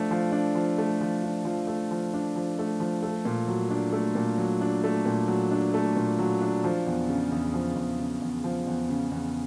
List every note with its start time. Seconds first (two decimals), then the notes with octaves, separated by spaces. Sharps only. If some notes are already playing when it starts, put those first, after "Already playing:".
Already playing: F3 A3 D4
0.11 F3
0.32 D4
0.55 F3
0.78 A3
1.01 F3
1.23 D4
1.45 F3
1.67 A3
1.91 F3
2.14 D4
2.36 F3
2.59 A3
2.80 F3
3.03 A3
3.25 A#2
3.48 F#3
3.70 D4
3.93 A3
4.15 A#2
4.38 F#3
4.61 D4
4.84 A3
5.06 A#2
5.28 F#3
5.51 D4
5.74 A3
5.96 A#2
6.19 F#3
6.42 D4
6.64 F3
6.86 E2
7.09 C#3
7.32 E2
7.54 F3
7.76 E2
7.98 C#3
8.21 E2
8.44 F3
8.67 E2
8.89 C#3
9.12 E2